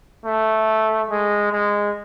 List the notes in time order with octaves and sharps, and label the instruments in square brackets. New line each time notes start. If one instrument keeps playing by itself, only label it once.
[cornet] A3
G#3
G#3